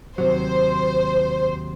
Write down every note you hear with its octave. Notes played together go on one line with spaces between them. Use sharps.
D#2 C3 F#3 C5